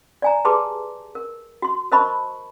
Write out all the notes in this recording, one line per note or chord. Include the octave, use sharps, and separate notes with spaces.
D5 G#5 A#5
G4 G#4 B4 A5 C6 D6
A#4
F#4 C6
A#4 C5 D#5 A5 B5 C#6